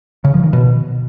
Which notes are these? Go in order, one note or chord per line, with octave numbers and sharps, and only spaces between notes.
C#3
F3
D#3
B2